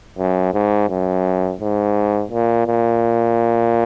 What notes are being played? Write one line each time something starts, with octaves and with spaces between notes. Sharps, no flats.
F#2
G#2
F#2
G#2
A#2
A#2